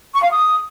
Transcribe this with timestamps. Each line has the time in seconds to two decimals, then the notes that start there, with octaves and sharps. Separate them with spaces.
0.15 C#6
0.23 F5
0.31 D#6